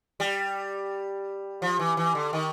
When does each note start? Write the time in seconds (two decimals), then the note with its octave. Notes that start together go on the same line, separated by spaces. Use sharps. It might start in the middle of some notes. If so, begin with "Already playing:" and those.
0.20 G3
1.62 F3
1.79 E3
1.97 E3
2.15 D3
2.33 D#3